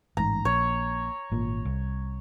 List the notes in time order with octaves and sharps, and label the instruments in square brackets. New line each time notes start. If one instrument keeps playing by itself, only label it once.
[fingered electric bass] A1 G#2 [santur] A#5
[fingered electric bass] A#1 [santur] C#5
[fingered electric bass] G#1 A#2
C2